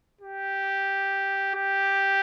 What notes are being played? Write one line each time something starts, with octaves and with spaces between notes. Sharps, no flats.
G4
G4